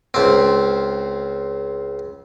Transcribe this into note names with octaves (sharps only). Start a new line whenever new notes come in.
C#2 C4